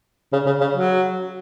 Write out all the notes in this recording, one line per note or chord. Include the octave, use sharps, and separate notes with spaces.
C#3
C#3
C#3
F#3